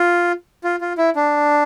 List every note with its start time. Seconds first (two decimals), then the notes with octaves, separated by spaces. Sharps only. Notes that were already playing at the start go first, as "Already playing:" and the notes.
Already playing: F4
0.64 F4
0.81 F4
0.98 E4
1.16 D4